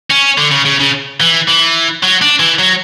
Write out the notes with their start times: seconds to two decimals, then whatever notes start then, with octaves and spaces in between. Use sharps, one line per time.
0.11 C#4
0.38 D3
0.51 C#3
0.65 C#3
0.79 C#3
1.20 E3
1.48 E3
2.03 F#3
2.22 D4
2.40 E3
2.59 F#3